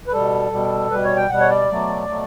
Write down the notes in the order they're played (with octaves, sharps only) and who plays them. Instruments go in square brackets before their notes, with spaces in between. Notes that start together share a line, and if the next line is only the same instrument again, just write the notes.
[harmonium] B4
B2 G3 A4
B2 G3
B2 G3 B4
C#5
G5
B2 G3 F#5
C#5
D5
B2 F#3 A3
B2 F#3 A3